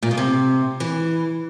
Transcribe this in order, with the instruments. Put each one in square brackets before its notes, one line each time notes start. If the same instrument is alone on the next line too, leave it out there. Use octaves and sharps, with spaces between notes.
[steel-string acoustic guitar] A#2
B2
C3
E3